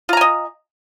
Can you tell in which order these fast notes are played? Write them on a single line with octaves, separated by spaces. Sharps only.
F4 A#5 G#5 D#5